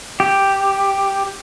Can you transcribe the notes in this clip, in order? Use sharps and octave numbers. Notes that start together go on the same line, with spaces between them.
G4